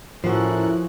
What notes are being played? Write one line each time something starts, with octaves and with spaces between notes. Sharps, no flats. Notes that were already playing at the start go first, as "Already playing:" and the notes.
A2 F3 C#4 E4 F#4 A4 A#4 F#6